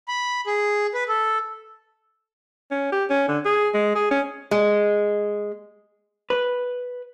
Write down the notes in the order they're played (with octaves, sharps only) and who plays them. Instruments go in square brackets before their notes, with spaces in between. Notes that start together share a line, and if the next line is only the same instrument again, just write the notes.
[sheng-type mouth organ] B5
G#4
B4
A4
[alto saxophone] C#4
G4
C#4
D3
G#4
G#3
G#4
C#4
[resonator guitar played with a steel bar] G#3
[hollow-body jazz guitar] B4